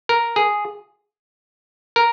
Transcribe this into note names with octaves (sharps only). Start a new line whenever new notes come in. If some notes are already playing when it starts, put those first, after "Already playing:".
A#4
G#4
A#4